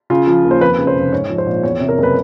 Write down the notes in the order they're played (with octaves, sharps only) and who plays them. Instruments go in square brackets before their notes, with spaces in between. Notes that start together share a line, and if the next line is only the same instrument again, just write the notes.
[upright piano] C#3 F4
F3
D#2
C5
F2 B4
C#3
C5
F1
G#2 C#5
F3
C5
A#1
E2 C#5
C3
A#4
F#1
B4